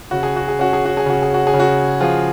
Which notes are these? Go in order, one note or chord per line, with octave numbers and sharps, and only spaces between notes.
C#3 F#4
G#4
F#4
G#4
C#4 F#4
G#4
F#4
G#4
C#3 F#4
G#4
F#4
G#4
C#3
F#4
F3 F4 G#4